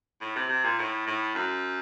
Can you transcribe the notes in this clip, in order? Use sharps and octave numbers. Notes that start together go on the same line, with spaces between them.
A2
C3
C3
A#2
A2
A2
F#2